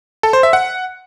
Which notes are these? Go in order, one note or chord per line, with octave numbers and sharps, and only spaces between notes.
A4
C5
E5
F#5